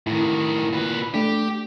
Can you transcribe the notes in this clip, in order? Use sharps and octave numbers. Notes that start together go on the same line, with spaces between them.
A2 D#3 E4
A#2 B4
A3 D4 G4